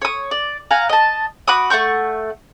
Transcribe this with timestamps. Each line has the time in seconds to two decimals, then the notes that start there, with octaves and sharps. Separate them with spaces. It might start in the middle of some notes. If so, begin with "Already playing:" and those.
0.02 C#5 D#6
0.31 D5
0.71 F5 F#5 G#5 A#5
0.89 D#5 A5
1.48 F#4 B5 D6 D#6
1.70 A3 F#5 C#6 G6